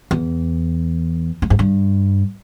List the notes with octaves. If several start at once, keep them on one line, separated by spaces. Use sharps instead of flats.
E2
G2
G#2
G2